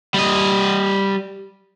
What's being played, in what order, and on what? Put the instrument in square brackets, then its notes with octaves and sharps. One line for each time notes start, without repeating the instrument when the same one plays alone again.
[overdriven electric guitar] G3 D#5